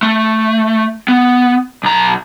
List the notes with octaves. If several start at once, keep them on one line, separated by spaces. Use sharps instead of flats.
A3
B3
B1 A#5